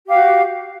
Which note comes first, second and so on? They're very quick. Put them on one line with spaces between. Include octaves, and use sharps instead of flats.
G4 F5 F#4